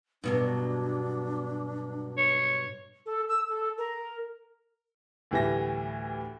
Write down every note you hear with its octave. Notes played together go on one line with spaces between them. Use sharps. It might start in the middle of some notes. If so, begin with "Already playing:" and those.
G2 B2 F#3 D4
C#5
A4
E6
A4
A#4
D2 A2 E3 G3 E5 A#6